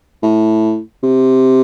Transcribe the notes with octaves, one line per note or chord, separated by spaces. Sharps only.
A2
C3